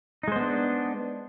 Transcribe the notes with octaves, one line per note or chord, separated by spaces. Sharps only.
G#3 B3 D4 D#4 C5